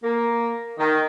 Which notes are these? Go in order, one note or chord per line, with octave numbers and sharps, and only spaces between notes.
A#3
D#3